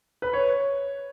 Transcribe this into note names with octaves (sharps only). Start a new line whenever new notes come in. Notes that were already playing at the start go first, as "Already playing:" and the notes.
B4
C#5